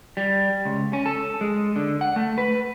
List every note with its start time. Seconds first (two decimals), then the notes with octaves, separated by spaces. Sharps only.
0.17 G3
0.65 C#2
0.93 C#4
1.06 A4
1.41 G#3
1.76 D3
2.01 F#5
2.16 A3
2.38 B4